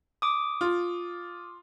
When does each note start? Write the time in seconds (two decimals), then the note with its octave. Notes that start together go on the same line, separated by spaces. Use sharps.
0.22 D6 D#6
0.61 F4